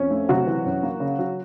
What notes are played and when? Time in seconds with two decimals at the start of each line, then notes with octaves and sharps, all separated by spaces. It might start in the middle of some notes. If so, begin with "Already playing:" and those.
Already playing: F2 C#4
0.10 A3
0.29 C3 F#3 F#4
0.47 E3
0.65 F#2
0.83 A#3
1.00 C#3
1.19 F#3